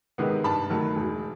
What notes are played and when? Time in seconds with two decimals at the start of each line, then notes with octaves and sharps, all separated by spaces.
0.18 C3 D#3 G#3 B3
0.44 G2 A5 B5
0.70 D#3 F#3 A3
0.96 E1